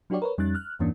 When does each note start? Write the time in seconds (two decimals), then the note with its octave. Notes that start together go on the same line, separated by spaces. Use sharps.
0.10 F#3 D4 F#4 G4 C#5 D5
0.22 A#4 B4 C#5
0.38 F2 G3 C#4 D#4 F#6 A6
0.55 F6 F#6
0.79 E2 G2 E3 A#3 C#4 D4